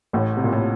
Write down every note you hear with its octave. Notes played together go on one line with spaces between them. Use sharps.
A1 A2
C3
A#2
A2